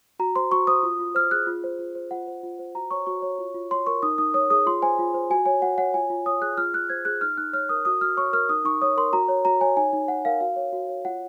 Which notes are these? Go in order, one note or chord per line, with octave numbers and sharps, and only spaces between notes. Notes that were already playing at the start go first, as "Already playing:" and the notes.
F#4 A#5
C5 C6
F#4 C#6
C5 D#6
F4
F4
C5 F6
G#4 F#6
F4
C5
F4
C5
F4 F#5
C5
F4
C5
F#4 A#5
C#5 C#6
F#4 C#6
C#5
F4
F4
C#5 C6
A#4 C#6
D#4 D#6
D#4 D#6
C#5 D#6
G#4 D#6
F4 C6
C5 G#5
F4
C5
F#4 G#5
C#5 G#5
F#4 F#5
C#5 F#5
F4 G#5
F4
C#5 D#6
G#4 F#6
F4 F6
F4 F#6
C5 G#6
G#4 F#6
D#4 F6
D#4 F#6
C#5 F6
A#4 D#6
F#4 D#6
F#4 F6
C#5 C#6
A#4 F6
D#4 D#6
D#4 C#6
C#5 D#6
A#4 C6
F#4 A#5
C#5
F#4 A#5
C#5 G#5
D#4 G#5
D#4
C#5 F#5
A#4 F5
F#4 F5
C#5
F#4
C#5
F4 F#5